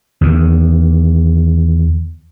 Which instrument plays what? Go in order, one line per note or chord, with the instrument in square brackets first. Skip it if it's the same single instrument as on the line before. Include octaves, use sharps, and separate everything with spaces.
[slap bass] E2 D#3